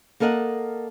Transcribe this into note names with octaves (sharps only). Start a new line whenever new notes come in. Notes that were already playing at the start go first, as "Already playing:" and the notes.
A#3 A4 A#4 D#5 F#5